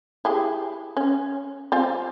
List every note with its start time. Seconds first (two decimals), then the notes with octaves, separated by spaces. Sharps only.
0.25 E4 G4 G#4
0.97 C#4
1.72 C4 F4 G#5